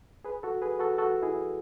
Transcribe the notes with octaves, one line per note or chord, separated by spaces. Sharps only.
G#4 B4
F#4 A4
G#4 B4
F#4 A4
F#4 A4
E4 G#4